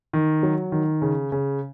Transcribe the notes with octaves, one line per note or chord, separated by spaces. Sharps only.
D#3
F#3
D#3
C#3
C#3